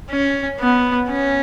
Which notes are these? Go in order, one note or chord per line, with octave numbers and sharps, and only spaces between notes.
C#4
B3
C#4